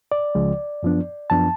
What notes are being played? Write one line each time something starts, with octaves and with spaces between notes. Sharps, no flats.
D5
C#2 C#3 F3 G#3
F#2 F3 B3 D4
F#2 F3 B3 D4 A5